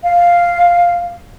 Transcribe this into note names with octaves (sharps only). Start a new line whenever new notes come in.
F5